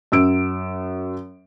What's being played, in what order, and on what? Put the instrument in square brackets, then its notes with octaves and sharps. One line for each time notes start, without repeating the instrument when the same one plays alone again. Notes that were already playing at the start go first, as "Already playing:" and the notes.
[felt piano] F#2 E6 D7